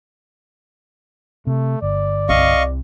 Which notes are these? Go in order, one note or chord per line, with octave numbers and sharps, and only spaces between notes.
C3 A3
G1 D5
C2 C3 D#5 F5 C#6